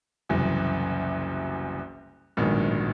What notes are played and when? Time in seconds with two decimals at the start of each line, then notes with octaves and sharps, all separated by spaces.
0.29 F#1 C2 F#2 E3
2.37 D1 A#1 G#2 D#3 B3 D4